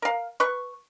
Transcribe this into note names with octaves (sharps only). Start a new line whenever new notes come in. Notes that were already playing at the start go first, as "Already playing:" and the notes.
A#4 F5
B4 C#6